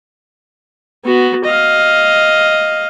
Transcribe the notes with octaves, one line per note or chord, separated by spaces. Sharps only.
B3 F#4
D#5 F5